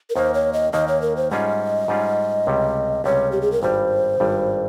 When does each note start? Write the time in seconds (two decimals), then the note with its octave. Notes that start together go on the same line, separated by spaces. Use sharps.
0.10 A#4
0.16 D#2 D#3 A#3 C5
0.34 C#5
0.53 D#5
0.73 D#2 D#3 A#3 D#5
0.88 C#5
1.02 A#4
1.16 C5
1.31 G#2 G3 C#4 F4 G#4 D#5
1.88 G#2 G3 C#4 F4 G#4
2.47 C#2 C3 G3 C#4
3.04 C#2 C3 G3 C#4 C#5
3.32 G4
3.42 G#4
3.52 A#4
3.62 G#1 G2 G3 C5
4.20 G#1 G2 G3